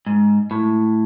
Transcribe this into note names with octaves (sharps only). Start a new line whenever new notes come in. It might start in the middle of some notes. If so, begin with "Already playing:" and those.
G#2
A2